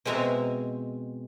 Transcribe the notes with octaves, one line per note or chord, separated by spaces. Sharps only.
B2 G#3 C4 E5 G#5 A#5